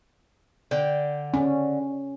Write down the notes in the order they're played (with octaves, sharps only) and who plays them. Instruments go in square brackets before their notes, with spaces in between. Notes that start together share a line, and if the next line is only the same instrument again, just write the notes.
[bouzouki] D3 G5
[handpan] C#4